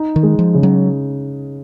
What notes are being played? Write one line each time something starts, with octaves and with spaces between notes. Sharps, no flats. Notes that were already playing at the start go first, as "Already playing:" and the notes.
Already playing: D#4
D#3
G#3
F3
C#3
F#3